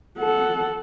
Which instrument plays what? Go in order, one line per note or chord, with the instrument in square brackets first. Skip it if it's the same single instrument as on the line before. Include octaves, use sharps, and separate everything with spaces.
[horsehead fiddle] A4 F#5